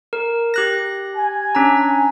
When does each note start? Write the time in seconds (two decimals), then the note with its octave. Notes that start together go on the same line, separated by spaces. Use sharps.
0.13 A#4
0.54 G4 F#6 A#6
1.15 G#5
1.55 C#4 D4 A#5